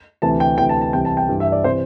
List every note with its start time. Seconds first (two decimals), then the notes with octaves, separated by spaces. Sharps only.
0.22 D2 C3 E3 A5
0.40 G5
0.58 D2 C3 E3 G5
0.69 A5
0.81 A5
0.93 C2 C3 E3 G5
1.05 A5
1.17 G5
1.29 G2 E3
1.40 E5
1.52 D5
1.64 C3 E3 C5